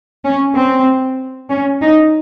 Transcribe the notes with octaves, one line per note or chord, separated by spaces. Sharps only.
C#4
C4
C#4
D#4